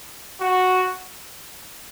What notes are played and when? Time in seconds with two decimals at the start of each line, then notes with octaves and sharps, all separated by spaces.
0.41 F#4